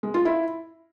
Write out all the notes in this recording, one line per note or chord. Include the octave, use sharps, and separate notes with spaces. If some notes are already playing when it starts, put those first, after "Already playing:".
G#3
F4
E4